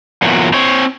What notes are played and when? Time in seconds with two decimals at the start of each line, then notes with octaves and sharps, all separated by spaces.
0.22 E2 A#2 F#3
0.53 C4 C#5